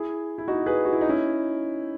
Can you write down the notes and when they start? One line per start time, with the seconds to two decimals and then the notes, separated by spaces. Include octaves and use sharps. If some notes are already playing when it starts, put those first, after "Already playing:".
Already playing: E4 G#4
0.38 E4
0.48 D#4 F#4
0.66 G#4 B4
0.85 F#4
0.93 E4
1.01 D#4
1.09 C#4 E4